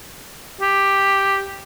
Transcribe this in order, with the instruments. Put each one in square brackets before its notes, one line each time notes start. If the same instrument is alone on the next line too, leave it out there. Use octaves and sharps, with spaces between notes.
[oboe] G4